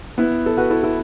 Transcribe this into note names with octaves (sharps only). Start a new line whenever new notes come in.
B3 E4
A4
F#4 B4
E4 A4
E4 A4